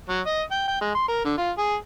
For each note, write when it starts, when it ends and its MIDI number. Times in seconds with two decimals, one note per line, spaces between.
0.09 0.20 54
0.27 0.42 75
0.51 0.65 79
0.68 0.79 79
0.81 0.93 56
0.95 1.03 84
1.08 1.22 70
1.25 1.33 50
1.38 1.51 65
1.58 1.75 68